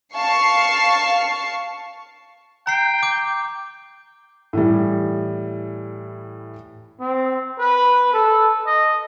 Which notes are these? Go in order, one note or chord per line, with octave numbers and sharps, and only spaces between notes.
F5 A5 C#6 C7
G5 A#5 C7
D6 G6
A2 E3 G3
C4
B4
A4
D#5